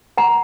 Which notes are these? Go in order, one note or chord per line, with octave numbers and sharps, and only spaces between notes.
F#5 A#5